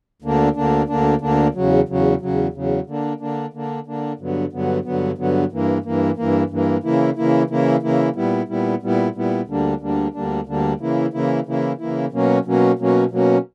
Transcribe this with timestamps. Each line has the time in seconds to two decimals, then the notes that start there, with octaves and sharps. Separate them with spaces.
0.22 D2 D3 A#3 D4
0.55 D2 D3 A#3 D4
0.88 D2 D3 A#3 D4
1.21 D2 D3 A#3 D4
1.54 E2 C#3 F#3
1.88 E2 C#3 F#3
2.21 E2 C#3 F#3
2.53 E2 C#3 F#3
2.87 D3 A#3 D4
3.20 D3 A#3 D4
3.53 D3 A#3 D4
3.86 D3 A#3 D4
4.19 G2 D3 F#3 B3
4.52 G2 D3 F#3 B3
4.85 G2 D3 F#3 B3
5.18 G2 D3 F#3 B3
5.52 G2 E3 A#3
5.84 G2 E3 A#3
6.17 G2 E3 A#3
6.50 G2 E3 A#3
6.83 C#3 E3 A#3 E4
7.16 C#3 E3 A#3 E4
7.50 C#3 E3 A#3 E4
7.82 C#3 E3 A#3 E4
8.16 A#2 G3 B3 E4
8.48 A#2 G3 B3 E4
8.82 A#2 G3 B3 E4
9.15 A#2 G3 B3 E4
9.47 D2 D3 G3 A#3 D4
9.80 D2 D3 G3 A#3 D4
10.14 D2 D3 G3 A#3 D4
10.46 D2 D3 G3 A#3 D4
10.80 C#3 E3 A#3 E4
11.13 C#3 E3 A#3 E4
11.46 C#3 E3 A#3 E4
11.79 C#3 E3 A#3 E4
12.12 B2 F#3 A#3 C#4
12.45 B2 F#3 A#3 C#4
12.79 B2 F#3 A#3 C#4
13.11 B2 F#3 A#3 C#4